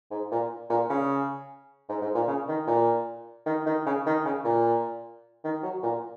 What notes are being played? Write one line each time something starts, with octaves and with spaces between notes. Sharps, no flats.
G#2
A#2
A#2
C#3
G#2
G#2
A#2
C#3
D#3
A#2
D#3
D#3
C#3
D#3
C#3
A#2
D#3
F#3
A#2